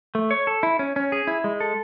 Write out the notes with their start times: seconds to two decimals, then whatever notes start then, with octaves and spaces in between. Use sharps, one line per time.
0.15 A3
0.31 C#5
0.47 A4
0.63 E4
0.79 C#4
0.96 C#4
1.12 G#4
1.27 E4
1.44 G#3
1.60 A4